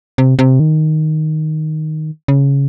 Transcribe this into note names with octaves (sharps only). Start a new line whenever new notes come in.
C3
C3
D#3
C#3